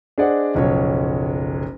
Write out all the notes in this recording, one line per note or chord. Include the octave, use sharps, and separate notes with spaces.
D4 G#4 C5 D5 D#5 F#5
F#1 B1 F3 C#5